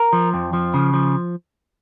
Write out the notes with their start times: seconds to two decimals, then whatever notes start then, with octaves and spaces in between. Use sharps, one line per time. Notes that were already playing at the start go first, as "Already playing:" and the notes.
Already playing: A#4
0.13 F3
0.34 F2
0.53 F3
0.74 C#3
0.94 F3